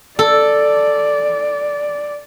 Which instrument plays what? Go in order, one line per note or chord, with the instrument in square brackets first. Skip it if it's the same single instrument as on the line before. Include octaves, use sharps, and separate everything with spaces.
[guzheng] A4 [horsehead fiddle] D5